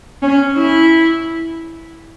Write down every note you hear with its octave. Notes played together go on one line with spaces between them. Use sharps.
C#4
E4